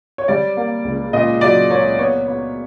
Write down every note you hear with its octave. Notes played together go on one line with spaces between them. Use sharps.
C#5
G3 D5
A#3
C#2
A#2 D#5
F#3 D5
A#3 C#5
B3 C#5
B3